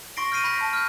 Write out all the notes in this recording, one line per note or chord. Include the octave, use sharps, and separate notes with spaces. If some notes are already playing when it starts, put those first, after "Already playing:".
C6 C#6 A#6 C7 D7
F6 G6 A#6 C7 D#7
B5 G6 A#6 B6
A5 A#6
F6 G6